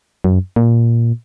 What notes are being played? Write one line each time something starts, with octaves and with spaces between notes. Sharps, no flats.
F#2
A#2